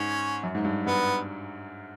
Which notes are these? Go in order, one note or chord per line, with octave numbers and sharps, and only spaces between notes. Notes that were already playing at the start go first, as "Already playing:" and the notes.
Already playing: G#2 C#4
F#2
G#2
G2
G2 B3